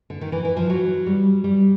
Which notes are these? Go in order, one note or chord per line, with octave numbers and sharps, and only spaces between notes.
D3
D#3
E3
E3
F3
F#3
G3
G3